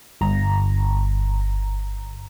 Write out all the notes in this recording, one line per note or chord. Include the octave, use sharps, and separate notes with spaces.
G1 A#5